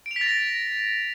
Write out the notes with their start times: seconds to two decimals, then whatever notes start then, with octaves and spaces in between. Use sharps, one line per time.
0.06 D7
0.11 F7
0.16 B6
0.21 A6
0.26 A#6